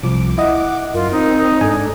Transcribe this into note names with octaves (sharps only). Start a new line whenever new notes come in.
C2 F3 D6
E4 D#5 F#5
F#2 F4 A#4
C4 D#4
G#2 D4 A4 G#5